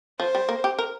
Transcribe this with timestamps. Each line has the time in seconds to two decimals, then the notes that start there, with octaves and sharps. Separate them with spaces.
0.19 F3 C5
0.35 G3
0.49 A#3
0.64 G4
0.79 A#4